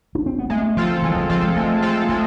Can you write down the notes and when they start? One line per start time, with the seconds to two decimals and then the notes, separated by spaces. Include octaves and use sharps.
0.15 D4
0.26 C4
0.39 B3
0.50 G#3 A3
0.77 F3 C4 F4 A4
1.03 E3 G#3
1.17 F3
1.30 F3 C4 F4 A4
1.43 G#3
1.56 G#3 A3
1.82 C4 F4 A4
2.09 G#3 A3